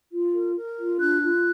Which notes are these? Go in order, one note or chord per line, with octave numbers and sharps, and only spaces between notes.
F4
A#4
A#4
F4
D4 F#6
F4